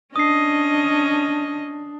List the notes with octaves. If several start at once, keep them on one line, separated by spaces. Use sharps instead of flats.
C#4 D4 D#5 D#6 C7